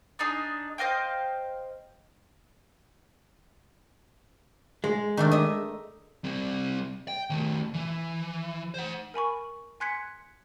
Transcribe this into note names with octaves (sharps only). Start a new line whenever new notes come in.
D4 D#4 G#4
C5 D#5 F5 G5
G#3
D#3 A3 D4
D#5 E5
G3 C4
G5
D#3 A3
E3
C5 F#5
A#4 G#5 B5 C#6
G#5 C6 F#6 G#6 B6 C#7